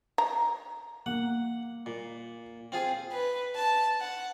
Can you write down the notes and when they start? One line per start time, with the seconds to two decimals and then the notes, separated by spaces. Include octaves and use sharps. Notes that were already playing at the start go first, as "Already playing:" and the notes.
0.18 A#5
1.06 A#3 F#5
1.86 A#2
2.72 C4 F4 G#4
3.12 B4
3.56 A5
4.00 F#5